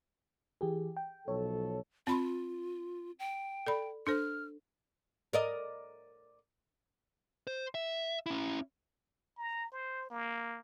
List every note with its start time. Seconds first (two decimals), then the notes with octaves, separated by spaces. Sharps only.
0.61 E3 G4 G#4
0.97 G5
1.28 B1 F3 A4 C#5
2.07 C4 F4 B5 C6
3.19 G5
3.67 A4 D5 B5
4.07 D4 A4 C5 F6
5.33 A#4 D5 D#5
7.47 C5
7.75 E5
8.26 C#4 E4
9.38 A#5
9.72 C5
10.10 A#3